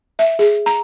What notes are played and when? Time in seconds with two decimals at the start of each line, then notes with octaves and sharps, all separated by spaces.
0.19 E5
0.39 G#4
0.66 A#5